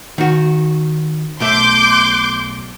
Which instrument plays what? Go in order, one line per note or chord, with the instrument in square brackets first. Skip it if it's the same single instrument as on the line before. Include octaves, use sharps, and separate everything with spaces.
[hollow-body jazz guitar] D#3 F#4
[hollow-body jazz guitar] B1 A3 E5 [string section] C6 D6 G6